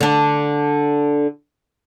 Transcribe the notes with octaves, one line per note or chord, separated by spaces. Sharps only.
D3 D4